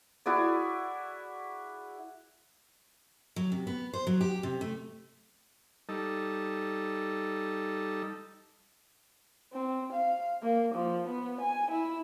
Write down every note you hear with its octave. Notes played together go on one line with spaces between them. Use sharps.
E4 F#4 G#4 D5
F#3
C3
B3
C5
F#3
G4
C3
A3
G3 D#4 A4
C4
F5
A#3
F3
B3
G#5
E4